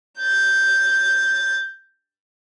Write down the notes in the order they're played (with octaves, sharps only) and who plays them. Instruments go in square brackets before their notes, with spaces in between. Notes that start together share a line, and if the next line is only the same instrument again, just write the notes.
[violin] G6 A6